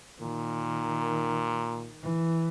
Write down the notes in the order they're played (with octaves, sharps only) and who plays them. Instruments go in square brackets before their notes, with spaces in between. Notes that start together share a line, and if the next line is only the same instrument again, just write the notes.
[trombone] A#2 [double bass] D#3
[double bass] E3